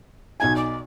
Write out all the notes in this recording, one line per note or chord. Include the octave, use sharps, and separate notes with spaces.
B1 D#4 G#5 G#6
D5